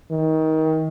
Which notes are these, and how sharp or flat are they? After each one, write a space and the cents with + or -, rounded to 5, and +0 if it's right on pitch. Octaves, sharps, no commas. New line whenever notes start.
D#3 +25